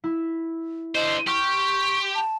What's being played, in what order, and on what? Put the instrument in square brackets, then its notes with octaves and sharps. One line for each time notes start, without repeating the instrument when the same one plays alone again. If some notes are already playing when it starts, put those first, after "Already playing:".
[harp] E4
[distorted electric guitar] D3 C5 [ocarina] D#5
[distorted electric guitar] G4 [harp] C6 F6 G6 [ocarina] C#6
[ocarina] A5